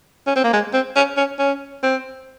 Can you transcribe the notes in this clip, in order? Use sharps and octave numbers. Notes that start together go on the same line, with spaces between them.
C#4
C4
A#3
G#3
C4
C#4
C#4
C#4
C4